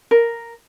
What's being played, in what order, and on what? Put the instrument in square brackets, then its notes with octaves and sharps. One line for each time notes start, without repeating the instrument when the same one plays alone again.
[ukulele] A#4